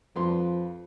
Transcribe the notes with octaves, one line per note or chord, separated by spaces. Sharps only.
F2 F3 B4 C6